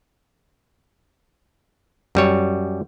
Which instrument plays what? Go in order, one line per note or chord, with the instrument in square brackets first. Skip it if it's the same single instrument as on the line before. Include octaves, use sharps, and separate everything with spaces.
[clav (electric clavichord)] F#2 G3 C#5